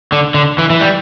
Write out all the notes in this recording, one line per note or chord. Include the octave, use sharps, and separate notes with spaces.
D3
D3
E3
E3
G3